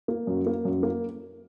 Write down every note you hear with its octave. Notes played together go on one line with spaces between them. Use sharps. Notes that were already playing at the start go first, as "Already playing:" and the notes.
A#3
F#2
A#3
F#2
A#3